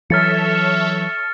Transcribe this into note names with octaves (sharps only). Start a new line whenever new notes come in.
E3 F#3 A4 C#5 E5 F6 A6 C#7